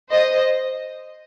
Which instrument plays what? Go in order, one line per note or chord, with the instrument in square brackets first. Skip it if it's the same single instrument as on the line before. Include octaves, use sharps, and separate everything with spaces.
[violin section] C5 D#5